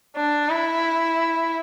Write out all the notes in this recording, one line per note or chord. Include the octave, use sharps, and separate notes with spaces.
D4
E4